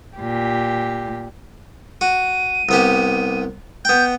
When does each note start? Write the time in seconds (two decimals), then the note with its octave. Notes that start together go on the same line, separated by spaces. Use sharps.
0.19 A#2 G4
2.01 F#4 D#7
2.69 C2 B3 G4
3.85 B3 G5 G6